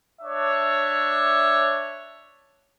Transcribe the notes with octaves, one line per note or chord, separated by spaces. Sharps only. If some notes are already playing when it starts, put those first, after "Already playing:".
D4 C#5 E5